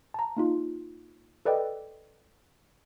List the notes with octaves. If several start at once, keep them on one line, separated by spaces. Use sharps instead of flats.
A5 A#5
A#3 D#4 F4
A4 B4 D5 D#5 G5